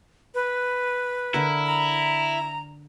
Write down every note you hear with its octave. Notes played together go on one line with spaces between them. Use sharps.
B4
D3 E4 A#4
A#5